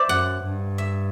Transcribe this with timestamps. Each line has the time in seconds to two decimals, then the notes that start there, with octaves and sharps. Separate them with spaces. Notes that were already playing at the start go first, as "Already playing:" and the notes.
Already playing: C5 D5 E5
0.09 F#2 F#5
0.44 G2
0.78 E5